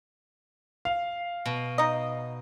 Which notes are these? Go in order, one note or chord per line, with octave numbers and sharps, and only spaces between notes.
F5
B2
D#4 D#5